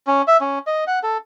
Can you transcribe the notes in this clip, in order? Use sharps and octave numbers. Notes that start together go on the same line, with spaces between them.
C#4
E5
C#4
D#5
F#5
A4